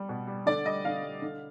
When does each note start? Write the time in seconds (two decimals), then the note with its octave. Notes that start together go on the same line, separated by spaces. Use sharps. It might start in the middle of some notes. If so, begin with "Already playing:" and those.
Already playing: G3
0.09 B2
0.27 G3
0.46 D3 D5
0.65 G3 D#5
0.85 D3 F5
1.03 G3
1.22 D3